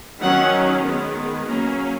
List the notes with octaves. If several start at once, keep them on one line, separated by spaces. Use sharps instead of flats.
D#3 F#3 C#4 F#5
D#3 G#3 B3
F#3 A#3 C#4 A#5